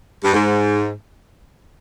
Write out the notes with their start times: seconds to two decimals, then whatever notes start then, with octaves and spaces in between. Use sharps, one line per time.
0.24 G2
0.34 G#2